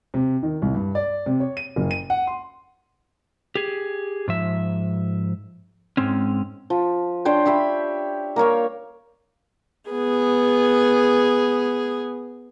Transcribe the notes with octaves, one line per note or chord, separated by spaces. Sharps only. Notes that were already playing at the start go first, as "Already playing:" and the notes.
C3
D#3
C2
G2
D5
C3
C#5
D#7
F#1
D#7
F#5
C6
G4 G#4
G#2 F3 E5
G#2 G#3 C4 C#4
F3
D4 C5 C#5 G5
G4 C#5 E5 B5
A#3 A#4 C#5 F5
B3 G#4